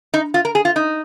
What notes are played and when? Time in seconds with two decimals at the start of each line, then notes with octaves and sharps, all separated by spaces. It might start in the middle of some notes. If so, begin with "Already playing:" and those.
0.14 D#4
0.34 F4
0.45 A#4
0.55 G#4
0.65 F4
0.76 D#4